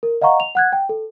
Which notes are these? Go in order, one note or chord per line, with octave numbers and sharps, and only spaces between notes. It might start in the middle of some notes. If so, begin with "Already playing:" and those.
A#4
D#5 F5 F#5 A#5 C#6
F7
F#5 F#6 G#6
G5
A4